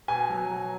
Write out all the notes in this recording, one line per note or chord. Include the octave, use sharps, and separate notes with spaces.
B2 G#5
F#3
F#3